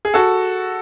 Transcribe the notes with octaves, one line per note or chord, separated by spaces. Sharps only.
G#4
F#4 A4